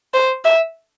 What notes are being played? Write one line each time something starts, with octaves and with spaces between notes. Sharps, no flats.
C5
E5